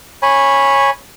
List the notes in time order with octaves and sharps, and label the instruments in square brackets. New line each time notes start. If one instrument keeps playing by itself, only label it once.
[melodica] C#5 G#5 B5